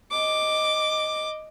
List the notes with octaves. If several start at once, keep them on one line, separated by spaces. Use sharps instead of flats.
D#5 D6